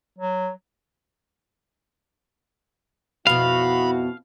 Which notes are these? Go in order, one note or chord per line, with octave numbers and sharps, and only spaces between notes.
F#3
F2 B2 E4 F#4 F5 B5